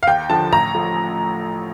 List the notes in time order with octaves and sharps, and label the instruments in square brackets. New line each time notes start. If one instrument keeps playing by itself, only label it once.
[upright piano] F5
D#2 G5
D3 F3 A5
A1 A#5
A2 F3